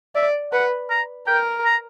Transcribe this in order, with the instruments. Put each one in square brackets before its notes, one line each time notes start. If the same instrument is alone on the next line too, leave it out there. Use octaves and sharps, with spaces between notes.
[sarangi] D5 [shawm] E5
[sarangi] B4 [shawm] F#5
[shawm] A#5
[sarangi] A#4 [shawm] G5
[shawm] A#5